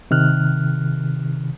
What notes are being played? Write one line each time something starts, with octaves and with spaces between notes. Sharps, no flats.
C3 D#3 F6 F#6